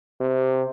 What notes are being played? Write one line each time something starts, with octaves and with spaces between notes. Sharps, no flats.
C3